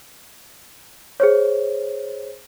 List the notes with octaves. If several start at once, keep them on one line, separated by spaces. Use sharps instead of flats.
G#4 C5 C#5